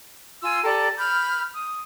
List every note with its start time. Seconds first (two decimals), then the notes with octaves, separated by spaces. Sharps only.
0.42 F4 G#5 C6 E6
0.64 G4 A4 D5 A#5
0.98 B5 F6 G6
1.53 D#6